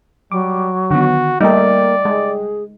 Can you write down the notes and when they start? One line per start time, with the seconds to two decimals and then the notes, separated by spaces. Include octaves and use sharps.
0.32 F#3 G3 D6
0.91 D3 D#3 B3 F#4
1.41 G3 A3 A#3 D#4 D5 G5
2.05 G#3 G#4